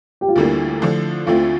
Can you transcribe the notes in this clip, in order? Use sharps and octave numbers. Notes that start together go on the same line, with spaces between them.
G4
F4
D2 D3 G3 A#3 E4
D3 F3 A3 D4
D2 D3 A3 C4 E4 F4